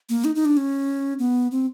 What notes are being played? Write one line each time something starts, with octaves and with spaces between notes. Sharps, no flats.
A#3
D#4
D#4
D4
C#4
B3
C4